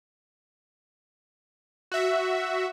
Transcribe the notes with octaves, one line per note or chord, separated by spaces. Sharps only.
F#4 E5